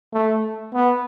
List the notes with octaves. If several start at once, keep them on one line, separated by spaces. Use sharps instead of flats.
A3
B3